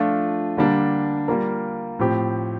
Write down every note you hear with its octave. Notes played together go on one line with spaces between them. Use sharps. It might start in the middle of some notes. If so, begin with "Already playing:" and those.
Already playing: F3 A3 D4 F4
D3 G3 A#3 D4
G3 A#3 F4 A#4
A2 F3 C4 G4